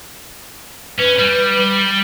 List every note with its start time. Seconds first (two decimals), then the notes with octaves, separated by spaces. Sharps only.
0.98 C#4 B4
1.18 G3